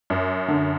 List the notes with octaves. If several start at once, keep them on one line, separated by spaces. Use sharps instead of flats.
F#2
D3